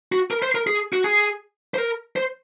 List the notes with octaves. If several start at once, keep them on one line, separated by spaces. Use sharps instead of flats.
F#4
A#4
C5
A#4
G#4
F#4
G#4
C5
A#4
C5